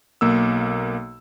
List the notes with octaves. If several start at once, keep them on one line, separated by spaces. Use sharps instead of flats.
B1 A#3 E6